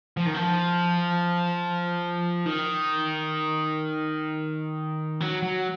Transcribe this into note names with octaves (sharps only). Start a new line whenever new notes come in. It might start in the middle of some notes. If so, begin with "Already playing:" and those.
F3
D#3
F3
D#3
F#3
F#3